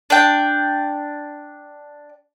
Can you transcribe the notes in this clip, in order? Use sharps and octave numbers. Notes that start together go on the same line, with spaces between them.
D4 G5